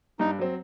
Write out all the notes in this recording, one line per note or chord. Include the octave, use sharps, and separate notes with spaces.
G2 D#4
F#3 C4